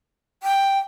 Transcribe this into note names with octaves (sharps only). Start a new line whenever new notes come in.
G5